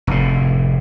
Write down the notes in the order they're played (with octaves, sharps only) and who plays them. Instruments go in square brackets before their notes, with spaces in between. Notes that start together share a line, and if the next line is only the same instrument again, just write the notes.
[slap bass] F1 A2